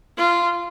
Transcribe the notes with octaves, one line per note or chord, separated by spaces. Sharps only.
F4